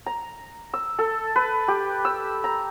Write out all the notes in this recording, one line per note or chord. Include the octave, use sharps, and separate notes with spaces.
A#5
E6
A4
B4
G4
E6
A#5